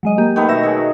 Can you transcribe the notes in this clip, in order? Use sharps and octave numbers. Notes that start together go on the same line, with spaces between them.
F#3 G#3 D#5
A#3 G4
D#3 A3 B3 G6
B2 E5 E6 A#6
F#3 G#4